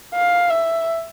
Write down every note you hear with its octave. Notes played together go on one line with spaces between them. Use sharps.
F5
E5